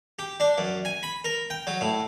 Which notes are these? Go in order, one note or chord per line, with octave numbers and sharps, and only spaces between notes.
G4
D4
F#2
G#5
B5
A#4
G5
F#3
A2